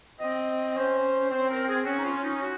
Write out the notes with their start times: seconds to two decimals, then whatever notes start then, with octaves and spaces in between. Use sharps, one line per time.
0.20 C4 D#5
0.76 C#4 C5
1.30 C4 C5
1.49 A#4
1.68 G#4
1.86 C#4 F#4
1.98 D#4
2.04 F4
2.23 D#4
2.42 F#4